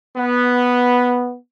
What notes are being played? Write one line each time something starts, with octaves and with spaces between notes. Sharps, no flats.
B3